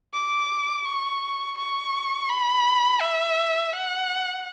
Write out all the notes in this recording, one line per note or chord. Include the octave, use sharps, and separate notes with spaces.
D6
C#6
C#6
B5
E5
F#5